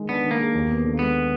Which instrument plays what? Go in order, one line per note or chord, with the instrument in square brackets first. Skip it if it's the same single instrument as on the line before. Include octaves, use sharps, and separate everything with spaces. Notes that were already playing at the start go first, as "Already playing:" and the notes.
Already playing: [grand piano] D#3 G#3 G#4
[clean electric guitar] B3 [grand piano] D4
[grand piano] D#3
[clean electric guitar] A#3
[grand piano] G#4
D#2
B3
D3
[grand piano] G#3 [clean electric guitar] B3